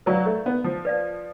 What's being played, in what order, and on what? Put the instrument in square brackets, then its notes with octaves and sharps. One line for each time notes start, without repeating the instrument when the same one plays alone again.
[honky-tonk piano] F#3 [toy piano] B4 D5 F5
[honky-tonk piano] A3
B3
F3
[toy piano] B4 D5 F5